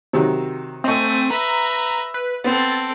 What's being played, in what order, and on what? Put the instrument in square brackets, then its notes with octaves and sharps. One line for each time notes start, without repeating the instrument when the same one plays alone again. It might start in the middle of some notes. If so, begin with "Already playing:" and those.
[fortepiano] C3 D#3 F#3
[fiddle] A3 G#5 [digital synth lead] C4 [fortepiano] D#5 C#6
[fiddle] B4 E5 [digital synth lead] A#5
[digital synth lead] B4
[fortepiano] B3 [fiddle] C4 A4 [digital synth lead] A6